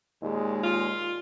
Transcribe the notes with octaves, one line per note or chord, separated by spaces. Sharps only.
D#2 A#2 G#3
F4